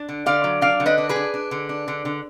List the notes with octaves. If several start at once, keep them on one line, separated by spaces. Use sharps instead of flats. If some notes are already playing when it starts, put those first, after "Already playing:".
Already playing: D4
D3
D3 D5 F5
F#3
D4 D5 F5
D3
B4 D#5
D4
G#4 B4
D4
D4
D3
D4
D3
D3